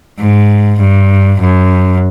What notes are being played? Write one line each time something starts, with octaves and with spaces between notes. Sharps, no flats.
G#2
G2
F#2